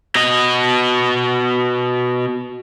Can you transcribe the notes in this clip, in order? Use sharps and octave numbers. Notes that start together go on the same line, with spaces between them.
B2 D#5